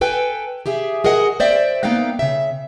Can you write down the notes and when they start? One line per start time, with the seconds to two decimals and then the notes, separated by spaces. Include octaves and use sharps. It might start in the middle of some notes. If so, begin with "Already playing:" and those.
0.01 A4 B4 G5 G#5
0.66 G4 G#4 E5
1.04 F#4 G#4 A#4 D#5 F#5
1.40 C5 D5 E5 G5
1.83 A#3 B3 D#4 E5 F5 G5
2.19 C#3 E5